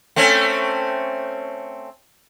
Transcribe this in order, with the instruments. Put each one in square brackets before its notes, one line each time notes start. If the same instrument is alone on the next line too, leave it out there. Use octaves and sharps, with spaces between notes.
[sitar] A3 C4 C#4